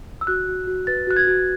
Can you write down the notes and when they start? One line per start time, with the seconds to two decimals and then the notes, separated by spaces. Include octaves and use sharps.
0.21 E6
0.27 F#4 F#6
0.48 F#4
0.67 F#4
0.87 B4 A6
1.07 F#4 F#6
1.16 G#6
1.27 F#4